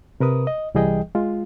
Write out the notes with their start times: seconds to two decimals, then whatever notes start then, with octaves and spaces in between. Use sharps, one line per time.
0.20 C3 A#4 B4 D#6
0.47 D#5
0.74 C2 E3 G3 G#4 D#5 G5
1.15 G#3 F4